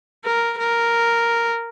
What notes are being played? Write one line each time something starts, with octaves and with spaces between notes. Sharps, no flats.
A#4
A#4